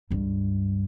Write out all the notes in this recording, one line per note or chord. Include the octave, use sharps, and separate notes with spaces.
C#2 G2